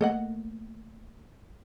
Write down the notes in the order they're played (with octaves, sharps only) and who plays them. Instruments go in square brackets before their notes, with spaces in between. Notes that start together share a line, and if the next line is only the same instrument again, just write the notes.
[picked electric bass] A3 A#3 [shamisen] A4 D#5 F#5